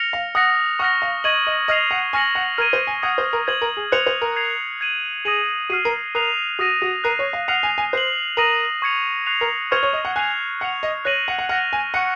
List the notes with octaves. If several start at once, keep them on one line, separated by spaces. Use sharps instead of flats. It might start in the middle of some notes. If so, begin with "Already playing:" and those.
Already playing: F6 A#6 C#7 F7
F5
F#5 D#6 F#6 A#6 C#7
F#5 C#6 F6 A#6
F5
D#5 C#6 G#6 D#7 F#7
D#5
D#5 F6 G#6 C7 F7
F#5
G#5 C#6 F6 A#6 C#7 F#7
F#5
A#4 F6 G#6 D#7
C5
G#5
F#5 D#6 G#6 D#7
C5
A#4
C5 G#6 D#7 F#7
A#4
G#4
C5 F#6 C#7 F7
C5
A#4
G#6 C7 F7
G#6 D#7 F#7
G#4 D#6 A#6 D#7 F#7
F#4 F6 C7 D#7
A#4
A#4 D#6 F#6 C7 F7
F#4 D#6 A#6 D#7
F#4
A#4 F#6 C7 D#7
C#5
F5
F#5 F6 C7 F7
G#5
G#5
C5 F#6 C7 F#7
A#4 D#6 A#6 D#7 F#7
C#6 G#6 C#7 F7
C#6 F#6 C7 F7
A#4
C5 C#6 F6 G#6 C#7 F7
C#5
D#5
F#5
G#5 F#6 C7 F7
F#5 F#6 C#7 F7
D#5
C#5 F#6 A#6 D#7 F#7
F#5
F#5
F#5 F6 A#6 F7
G#5
F#5 C#6 F#6 C#7